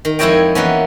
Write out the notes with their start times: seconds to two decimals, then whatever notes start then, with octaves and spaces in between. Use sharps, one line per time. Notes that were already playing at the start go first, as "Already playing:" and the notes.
0.05 D#3
0.19 F2 G#3 E4 C#5 D#5 G5
0.55 E3 A#3 B3 C#4